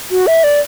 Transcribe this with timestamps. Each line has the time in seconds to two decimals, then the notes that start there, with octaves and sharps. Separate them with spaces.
0.11 F#4
0.27 E5
0.44 D5